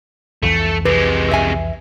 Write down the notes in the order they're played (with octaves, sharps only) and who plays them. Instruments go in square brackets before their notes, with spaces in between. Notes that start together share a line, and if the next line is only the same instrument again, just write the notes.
[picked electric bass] C2 F2 E3 [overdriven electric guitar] A3
[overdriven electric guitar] C3 G#3 [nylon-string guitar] B4
[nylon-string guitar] E5 G#5